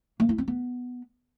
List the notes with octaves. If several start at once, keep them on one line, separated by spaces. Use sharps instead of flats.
A#3
E4
C4
B3